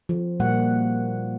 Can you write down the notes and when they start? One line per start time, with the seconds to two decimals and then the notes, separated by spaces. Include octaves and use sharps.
0.09 F3
0.40 A#2 G3 A#3 F#5